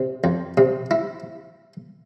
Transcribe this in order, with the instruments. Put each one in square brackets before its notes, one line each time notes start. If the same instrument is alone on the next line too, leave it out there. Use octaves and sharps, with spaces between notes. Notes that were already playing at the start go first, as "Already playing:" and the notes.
Already playing: [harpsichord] C3
F2
C3
E4